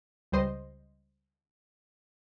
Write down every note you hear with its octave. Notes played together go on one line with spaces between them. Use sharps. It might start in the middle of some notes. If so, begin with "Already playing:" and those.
C#2 G3 C5 D#5 C6